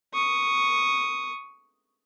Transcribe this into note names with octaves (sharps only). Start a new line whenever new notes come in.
C#6 D#6